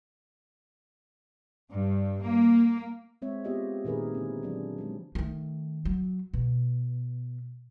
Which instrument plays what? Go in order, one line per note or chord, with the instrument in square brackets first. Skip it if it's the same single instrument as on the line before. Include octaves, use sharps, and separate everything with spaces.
[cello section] G2
A#3
[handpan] G#3 C4 C#5 E5
B3 F4 G4 D#5 E5
A#2 D#3 G#4 A#4 B4
D3 C4
F#3 D4
F3 G#3
[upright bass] D#3 A3
F#3
B2